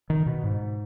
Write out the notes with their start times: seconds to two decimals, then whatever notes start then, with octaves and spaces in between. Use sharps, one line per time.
0.10 D#3
0.26 B2
0.43 G#2